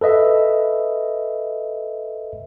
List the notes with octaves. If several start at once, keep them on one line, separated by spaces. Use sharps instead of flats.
A4 B4 D#5 E5